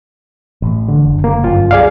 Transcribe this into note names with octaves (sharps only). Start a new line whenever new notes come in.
A1
D3
F#1
A#3
G1 F#2 F4
C2 G#4 D5 F5